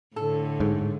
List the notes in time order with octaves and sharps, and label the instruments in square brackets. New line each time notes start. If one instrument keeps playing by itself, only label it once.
[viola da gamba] A2 D3 [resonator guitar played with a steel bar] A4
[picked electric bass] G#2